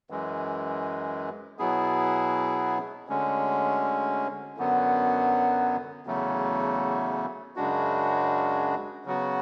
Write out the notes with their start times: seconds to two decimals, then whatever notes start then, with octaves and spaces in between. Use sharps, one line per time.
0.10 F#2 E3 G#3
1.59 B2 F#3 B3 E4 G#4
3.08 D2 D3 G#3 C#4
4.57 F#2 D3 F#3 B3
6.07 E2 C#3 F#3 A3
7.56 F#2 C#3 G#3 D4 F#4
9.05 C#3 F#3 B3 F#4